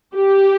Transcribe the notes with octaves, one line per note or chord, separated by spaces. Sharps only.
G4